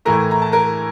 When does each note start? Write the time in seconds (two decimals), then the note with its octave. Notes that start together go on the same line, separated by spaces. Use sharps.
0.05 A2 E3 A3 A#4 A#5
0.31 A#5
0.42 A5
0.52 A#4 A#5